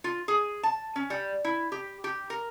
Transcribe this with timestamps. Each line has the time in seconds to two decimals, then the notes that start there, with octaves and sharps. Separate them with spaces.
0.04 F4
0.28 G#4
0.63 A5
0.96 C#4
1.10 G3
1.45 E4
1.72 G4
2.04 G4
2.30 A#4